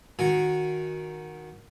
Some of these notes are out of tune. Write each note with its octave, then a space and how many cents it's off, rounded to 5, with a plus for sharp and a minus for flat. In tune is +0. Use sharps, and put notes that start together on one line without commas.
D#3 +0 F#4 -10 G#5 +0